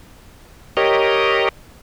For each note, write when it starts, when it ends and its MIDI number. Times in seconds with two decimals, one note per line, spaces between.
0.77 1.49 67
0.77 1.49 70
0.77 1.49 73
0.77 1.49 75